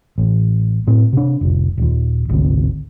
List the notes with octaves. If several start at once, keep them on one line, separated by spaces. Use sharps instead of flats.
A1
A2 C4
C3 D4
F1 C2
D#1 D#2
G#1 D2 C3